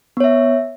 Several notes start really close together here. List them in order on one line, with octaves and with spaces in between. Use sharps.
B3 C#5 E5